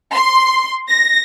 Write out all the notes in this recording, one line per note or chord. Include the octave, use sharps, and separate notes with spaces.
C6
A#6